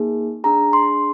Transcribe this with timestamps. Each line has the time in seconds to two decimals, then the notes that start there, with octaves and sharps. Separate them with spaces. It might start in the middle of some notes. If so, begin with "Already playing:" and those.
Already playing: A#3 D#4 G#4
0.44 D4 G#4 A#5
0.73 C6